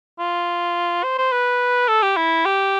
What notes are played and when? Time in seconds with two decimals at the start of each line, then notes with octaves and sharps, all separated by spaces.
0.19 F4
1.04 C5
1.18 C5
1.32 B4
1.88 A4
2.03 G4
2.17 E4
2.45 G4